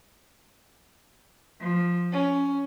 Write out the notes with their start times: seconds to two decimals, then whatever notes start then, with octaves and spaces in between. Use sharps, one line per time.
1.60 F3
2.11 C#4